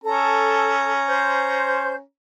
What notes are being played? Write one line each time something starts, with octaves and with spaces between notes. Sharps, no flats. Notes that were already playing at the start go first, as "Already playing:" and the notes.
C#4 A4 A#5
C5 G6